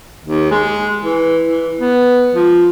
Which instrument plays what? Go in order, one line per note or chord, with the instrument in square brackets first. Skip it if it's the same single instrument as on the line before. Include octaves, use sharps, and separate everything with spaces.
[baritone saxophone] D#2
G#3
E3
E3
B3
F3